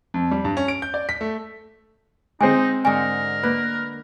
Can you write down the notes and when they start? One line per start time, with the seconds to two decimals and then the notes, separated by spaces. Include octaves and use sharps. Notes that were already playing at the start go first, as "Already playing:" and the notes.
0.14 F2
0.31 G3
0.45 G2
0.57 C#4
0.68 D7
0.82 G6
0.94 D5
1.09 B6
1.21 A3
2.41 G#3 C4 D#4 G#5
2.85 G#2 D3 A#4 G#5
3.43 A#3 B4